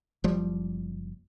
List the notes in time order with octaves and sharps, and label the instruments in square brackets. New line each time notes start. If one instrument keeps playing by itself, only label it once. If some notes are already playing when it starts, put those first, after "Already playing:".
[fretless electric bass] F#1 F3 G3